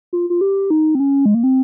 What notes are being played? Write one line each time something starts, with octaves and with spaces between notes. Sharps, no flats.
F4
F4
G4
D#4
C4
C#4
G#3
A#3
C4